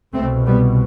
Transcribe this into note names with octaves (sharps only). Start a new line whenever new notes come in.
C2 B2 A3 C4
G3 B3